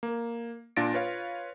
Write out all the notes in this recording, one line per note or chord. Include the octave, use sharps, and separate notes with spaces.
A#3
A#2 D4 F4 A6 A#6 D7
F4 B4 C#5 F5